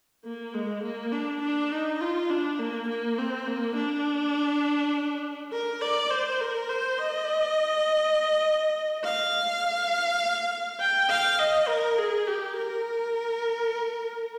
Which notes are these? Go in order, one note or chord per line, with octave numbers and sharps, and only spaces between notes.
A#3
G#3
A#3
D4
D4
D#4
F4
D4
A#3
A#3
C4
A#3
D4
A#4
D5
C5
A#4
C5
D#5
F5
G5
F5
D#5
A#4
G#4
G4
A#4